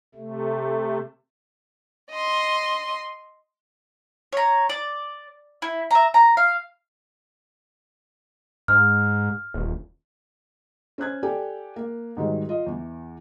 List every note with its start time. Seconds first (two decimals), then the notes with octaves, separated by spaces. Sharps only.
0.15 C3 A3
2.12 D#5 C6
4.33 C#5 A#5
4.69 D5
5.62 E4
5.91 E5 A#5
6.14 A#5
6.37 F5
8.68 G#2 F6
9.54 D#1
10.98 C#4 C5 F#6 G#6
11.23 G4 A4 D5 G5 G#5
11.76 A#3
12.17 G#2 D#3 F#3 G3
12.49 F4 D#5
12.67 E2 E3